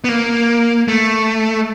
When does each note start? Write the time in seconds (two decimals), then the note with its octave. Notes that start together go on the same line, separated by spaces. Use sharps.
0.04 B3
0.09 A#3
0.88 A3